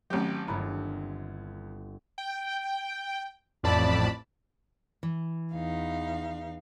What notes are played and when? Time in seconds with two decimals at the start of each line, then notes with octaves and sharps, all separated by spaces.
0.10 G#1 F#3 A3 C4 C#4 G4
0.48 G1 D#2 G3 E4 A#5 B5
2.18 G5
3.63 A1 F2 A2 D5 A5 B5
5.03 E3
5.53 E2 D#4 F5